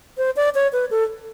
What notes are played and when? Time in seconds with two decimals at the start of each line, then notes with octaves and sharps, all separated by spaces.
0.18 C5
0.36 D5
0.55 C#5
0.73 B4
0.91 A4